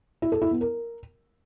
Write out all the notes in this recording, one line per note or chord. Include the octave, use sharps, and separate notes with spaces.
E4
A4
E4
B3
A#4